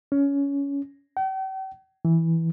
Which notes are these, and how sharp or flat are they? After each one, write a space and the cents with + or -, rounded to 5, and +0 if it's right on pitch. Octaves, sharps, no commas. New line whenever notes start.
C#4 +20
G5 -45
E3 -5